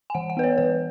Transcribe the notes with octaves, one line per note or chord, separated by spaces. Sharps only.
G#5
E3 F#5
F#5
B3 B4
C#5
E3 B4